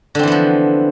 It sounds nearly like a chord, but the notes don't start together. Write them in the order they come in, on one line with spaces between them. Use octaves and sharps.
D3 C4 E3 B3 F3